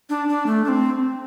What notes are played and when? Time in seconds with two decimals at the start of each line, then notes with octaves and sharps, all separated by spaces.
0.10 D4
0.28 D4
0.46 A3
0.64 D4
0.68 C4